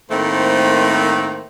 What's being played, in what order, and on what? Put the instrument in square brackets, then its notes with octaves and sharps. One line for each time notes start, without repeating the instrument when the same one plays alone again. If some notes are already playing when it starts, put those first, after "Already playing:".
[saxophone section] A2 D#3 A3 A#3 C4 C5